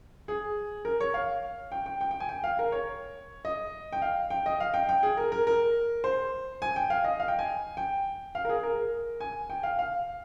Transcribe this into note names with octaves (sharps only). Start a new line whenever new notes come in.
G#4
A#4
C#5
F5
G5
G5
G5
G5
G#5
G5
F5
A#4
C#5
D#5
G5
F5
G5
D#5
F5
G5
G5
G#4
A#4
A#4
A#4
C5
G#5
G5
F5
D#5
F5
G5
G#5
G5
F5
A#4
G#4
A#4
G#5
G5
F5
F5